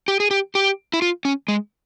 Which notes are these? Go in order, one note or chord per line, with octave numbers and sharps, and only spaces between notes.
G4
G#4
G4
G4
E4
F4
C#4
G#3